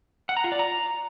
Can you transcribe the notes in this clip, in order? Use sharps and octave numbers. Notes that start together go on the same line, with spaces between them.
F#5
A#5
F4
D5
A#5